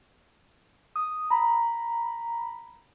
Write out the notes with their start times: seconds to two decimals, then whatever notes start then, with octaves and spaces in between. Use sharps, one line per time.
0.96 D#6
1.30 A#5 B5